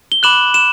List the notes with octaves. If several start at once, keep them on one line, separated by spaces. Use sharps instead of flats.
G7
B5 D6 F#6 E7 F#7
E7